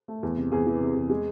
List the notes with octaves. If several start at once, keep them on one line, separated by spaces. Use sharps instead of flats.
A3
E2
C3
E2 G#4
E3
C3
E2
G#3